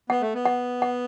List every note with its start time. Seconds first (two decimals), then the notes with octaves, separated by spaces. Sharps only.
0.10 B3 F#5
0.22 A3
0.34 B3
0.46 F#5
0.82 F#5